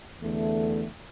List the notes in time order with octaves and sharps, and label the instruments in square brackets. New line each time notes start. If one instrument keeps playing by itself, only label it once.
[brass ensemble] E2 D3 A3